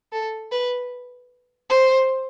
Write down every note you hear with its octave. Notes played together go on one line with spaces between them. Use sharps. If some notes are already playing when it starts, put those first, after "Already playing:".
A4
B4
C5